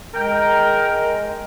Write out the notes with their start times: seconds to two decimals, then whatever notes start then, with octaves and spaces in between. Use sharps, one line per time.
0.15 G#3 A#4 G5